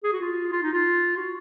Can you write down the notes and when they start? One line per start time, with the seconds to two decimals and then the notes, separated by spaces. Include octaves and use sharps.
0.04 G#4
0.13 F#4
0.21 F4
0.52 F4
0.63 D#4
0.73 F4
1.17 F#4